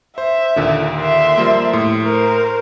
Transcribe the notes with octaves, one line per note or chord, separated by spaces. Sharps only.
C5 E5
D#2 A#2 D3
E5 C6
F3 G3 A#3
A2
A#4 C5